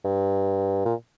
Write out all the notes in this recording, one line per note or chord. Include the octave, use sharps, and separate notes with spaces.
G2
A#2